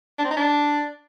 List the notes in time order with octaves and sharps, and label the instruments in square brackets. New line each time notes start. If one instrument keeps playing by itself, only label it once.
[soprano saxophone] D4
C4
D#4
D4